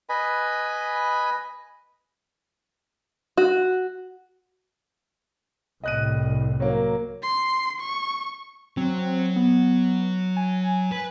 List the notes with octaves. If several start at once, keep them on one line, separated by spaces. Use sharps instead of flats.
B4 D#5 G#5 B5
F#4
C2 A2 D#5 F#6 D#7
F#3 A#3
C6
C#6
F#3 C4
B3
G#5
B4